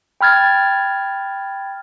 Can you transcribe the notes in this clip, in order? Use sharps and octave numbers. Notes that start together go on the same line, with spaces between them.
G5 B5 F6 G#6 A6